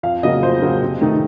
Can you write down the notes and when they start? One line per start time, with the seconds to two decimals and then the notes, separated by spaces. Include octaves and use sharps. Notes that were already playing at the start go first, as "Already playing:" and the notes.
0.03 F2 F5
0.23 C#3 F#3 A#3 D#5
0.42 F2 C5
0.62 C#3 F#3 A#3
0.82 C3
1.01 D#3 A3 D#4